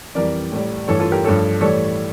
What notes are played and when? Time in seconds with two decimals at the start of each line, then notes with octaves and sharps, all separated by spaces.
0.15 F2 E3 G3 A#4 D5
0.52 A2 G3
0.88 G2 E3 A3 A4 C#5
1.00 F4 A4
1.12 G4 A#4
1.24 G2 F3 A3 A4 C#5
1.61 A2 E3 G3 A4 C#5